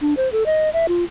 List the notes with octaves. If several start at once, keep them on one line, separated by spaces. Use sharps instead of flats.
D4
C5
A4
D#5
E5
F4